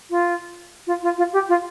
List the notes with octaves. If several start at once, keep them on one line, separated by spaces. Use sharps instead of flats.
F4
F4
F4
F4
G4
F4